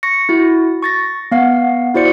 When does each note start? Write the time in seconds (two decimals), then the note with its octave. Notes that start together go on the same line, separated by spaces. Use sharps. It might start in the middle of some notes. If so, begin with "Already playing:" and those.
0.03 C#6 A#6 C#7
0.29 E4 F#4
0.82 C#6 A6 A#6
1.32 B3 F5 F#5
1.94 E4 F#4 C5 D5 C#7